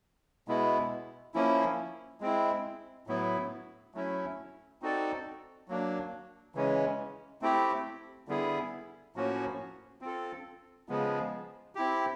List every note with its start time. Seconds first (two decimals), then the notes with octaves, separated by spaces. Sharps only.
0.48 B2 G#3 B3 E4
1.34 F3 A#3 C#4 E4
2.21 G#3 C4 E4
3.07 A2 F#3 B3 E4
3.94 F#3 A3 C#4 E4
4.82 C4 D#4 F#4 A4 D5
5.68 F#3 A#3 D4
6.55 C#3 E3 G#3 C#4
7.42 A3 C4 E4 G4
8.28 D3 G3 B3 E4 G#4
9.16 A2 F3 A#3 C#4 F#4
10.01 C4 F4 A4
10.89 C#3 F3 G#3 B3
11.75 C4 E4 G4